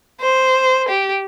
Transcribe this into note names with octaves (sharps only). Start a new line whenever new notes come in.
C5
G4